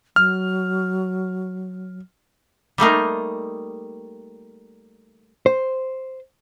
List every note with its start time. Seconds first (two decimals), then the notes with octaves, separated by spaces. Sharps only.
0.16 F#3 F6
2.78 G3 A3 A#3 D#4
5.46 C5